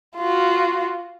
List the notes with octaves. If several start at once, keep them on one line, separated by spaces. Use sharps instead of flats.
F4 F#4